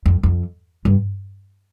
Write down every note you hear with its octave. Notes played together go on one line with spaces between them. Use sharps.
F2
F2
G2